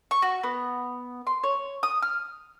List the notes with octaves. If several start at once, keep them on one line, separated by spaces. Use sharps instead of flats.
C#6
F#4
B3
C6
C#5
D#6
F6